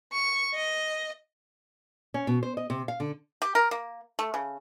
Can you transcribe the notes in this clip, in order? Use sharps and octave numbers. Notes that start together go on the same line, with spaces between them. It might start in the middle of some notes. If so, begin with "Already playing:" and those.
C#6
D#5
C#4
B2
C5
D#5
C3
F5
D3
G4
A#4
A#3
A3
C#3